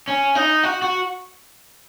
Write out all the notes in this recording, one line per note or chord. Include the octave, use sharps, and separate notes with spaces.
C#4
D#4
F#4
F#4